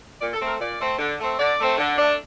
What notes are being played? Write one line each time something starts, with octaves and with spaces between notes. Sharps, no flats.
A#2 D5
A4
A3 C4
A#4
A#2 D5
A3 C4
D3
A3 C4
D3 D5
A3 C4
D3
A3 D4